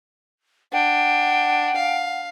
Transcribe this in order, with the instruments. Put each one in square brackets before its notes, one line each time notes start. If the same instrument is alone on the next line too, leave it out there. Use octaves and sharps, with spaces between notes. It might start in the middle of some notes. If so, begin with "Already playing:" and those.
[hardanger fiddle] D4 [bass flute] F#5 [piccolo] G5
[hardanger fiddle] F5